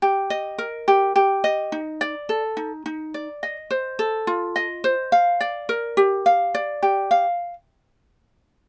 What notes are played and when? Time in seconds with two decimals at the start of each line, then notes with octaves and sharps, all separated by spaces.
0.02 G4
0.30 D#5
0.58 A#4
0.88 G4
1.16 G4
1.44 D#5
1.72 D#4
2.01 D5
2.29 A4
2.57 D#4
2.86 D#4
3.14 D5
3.43 D#5
3.71 C5
3.99 A4
4.27 F4
4.56 D#5
4.84 C5
5.12 F5
5.41 D5
5.69 A#4
5.97 G4
6.26 F5
6.55 D5
6.82 G4
7.11 F5